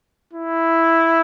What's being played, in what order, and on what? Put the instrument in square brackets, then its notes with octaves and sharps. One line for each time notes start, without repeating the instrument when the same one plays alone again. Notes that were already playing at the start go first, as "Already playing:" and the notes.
[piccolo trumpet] E4